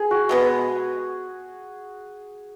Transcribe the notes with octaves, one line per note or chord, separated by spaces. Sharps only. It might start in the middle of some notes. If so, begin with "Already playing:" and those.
Already playing: G#4
F#4
B2 G#3 B3